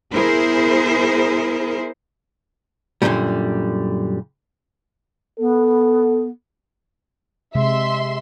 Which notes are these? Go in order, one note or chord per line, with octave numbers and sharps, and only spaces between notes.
B3 E4 G#4 A#4 C5
F#2 A#2 D3 D#3 F#3 G3
B3 A4
C3 G#3 E5 C6